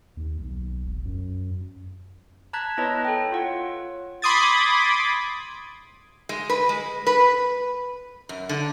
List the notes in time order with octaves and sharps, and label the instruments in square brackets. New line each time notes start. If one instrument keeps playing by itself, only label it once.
[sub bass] D#2
B1
E1
F#2
[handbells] A5 A#5 F#6 G#6 B6
B3 E4 B4 C#5 D#5 A5
A4 G5
F4 C#5 F#5
[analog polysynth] B5 C6 D6 D#6 G#6 A6
[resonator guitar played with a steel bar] G#3
B4
G#3
B4
F#2
D3